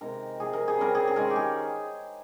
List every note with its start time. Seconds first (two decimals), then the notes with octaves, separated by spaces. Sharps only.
0.01 C3 D#3 G#3 A#4
0.39 C3 F3 C4 G#4
0.53 A#4
0.68 G#4
0.77 C#3 G3 C4 A#4
0.95 G#4
1.07 G#4
1.16 D#3 G#3 C#4 A#4
1.30 G4
1.36 G#4